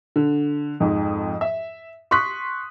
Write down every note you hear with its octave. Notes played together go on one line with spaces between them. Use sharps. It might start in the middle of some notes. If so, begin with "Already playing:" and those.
D3
F2 G#2
E5
C6 C#6 D#6 F#6 B6